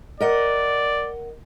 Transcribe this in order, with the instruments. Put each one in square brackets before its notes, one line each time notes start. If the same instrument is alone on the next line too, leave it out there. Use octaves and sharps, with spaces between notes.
[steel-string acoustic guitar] A#4 D#5 F#5 [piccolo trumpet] D5